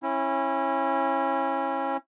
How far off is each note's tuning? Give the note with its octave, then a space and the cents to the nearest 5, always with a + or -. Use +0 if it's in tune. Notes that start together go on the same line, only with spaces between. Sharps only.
C#4 -25 E4 +0